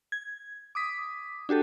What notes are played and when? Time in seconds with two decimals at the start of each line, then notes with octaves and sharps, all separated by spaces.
0.12 G#6
0.75 D6 D#6 B6
1.49 D4 F#4 G4 A4